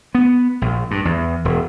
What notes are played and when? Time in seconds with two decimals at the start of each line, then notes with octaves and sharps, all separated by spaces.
0.15 B3
0.62 A#1
0.91 G2
1.05 E2
1.45 E1